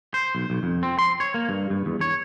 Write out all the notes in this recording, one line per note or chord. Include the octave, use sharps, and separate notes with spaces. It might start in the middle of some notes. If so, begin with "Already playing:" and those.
C5
B1
B1
F2
C4
C6
C#5
A#3
G2
G2
E2
C#5